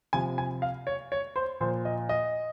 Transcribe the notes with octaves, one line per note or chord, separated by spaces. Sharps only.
C3 F3 G#5
G#5
F5
C#5
C#5
C5
A#2 F3 C5
D#5
D#5